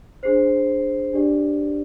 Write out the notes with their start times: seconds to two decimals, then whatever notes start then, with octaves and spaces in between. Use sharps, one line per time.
0.23 D4 G#4 C5 C7
1.13 D4 G4 D5